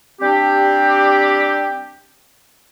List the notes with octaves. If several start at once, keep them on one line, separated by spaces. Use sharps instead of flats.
G3 C4 D4 G4